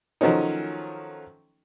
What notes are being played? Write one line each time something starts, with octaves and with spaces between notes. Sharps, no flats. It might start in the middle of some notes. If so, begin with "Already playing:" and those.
D#3 F3 F#3 A3 C#4 D#4